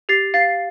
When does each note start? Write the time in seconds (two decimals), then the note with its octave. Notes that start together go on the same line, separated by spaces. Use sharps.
0.09 G4 A6 C7
0.34 F5 A6 C7